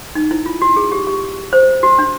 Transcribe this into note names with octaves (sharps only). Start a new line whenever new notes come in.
D#4
E4
F4
F#4
G#4
G4
G4
C5
F#4
D4